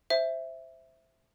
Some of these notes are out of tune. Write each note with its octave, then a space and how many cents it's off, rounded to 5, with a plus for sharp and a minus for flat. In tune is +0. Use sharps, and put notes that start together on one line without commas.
C5 +0 E5 +0